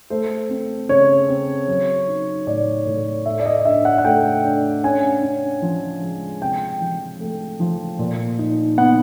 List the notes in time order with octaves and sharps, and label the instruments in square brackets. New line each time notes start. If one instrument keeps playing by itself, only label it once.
[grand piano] A3 C5
C4
C#3 C#5
C4
F#3
D#4
A2 D5
A2
A3 E5
D5
D#5
D#5
D4 E5
F#5
F#5
A3 G5
D4
C#4 G#5
C#4
F3
G#3
C3 G5
F3
A3
F3
A#2
D#4
B3 F#5